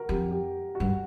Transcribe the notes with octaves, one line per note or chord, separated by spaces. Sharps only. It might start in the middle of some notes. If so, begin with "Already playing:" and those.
Already playing: F#4 A#4
F2 G4
G4
F#4
G2